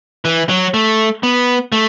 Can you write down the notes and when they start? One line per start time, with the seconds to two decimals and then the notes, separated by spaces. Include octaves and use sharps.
0.25 E3
0.49 F#3
0.74 A3
1.23 B3
1.72 A3